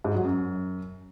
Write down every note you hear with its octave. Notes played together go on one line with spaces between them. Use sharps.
G#2
F#3
F#2